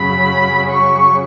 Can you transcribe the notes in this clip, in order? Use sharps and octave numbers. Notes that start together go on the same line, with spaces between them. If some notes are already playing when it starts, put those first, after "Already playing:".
Already playing: F#2 C#3 F#3 B5
C#6